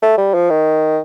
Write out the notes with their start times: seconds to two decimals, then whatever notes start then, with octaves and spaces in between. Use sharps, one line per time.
0.02 A3
0.18 G3
0.34 F3
0.50 D#3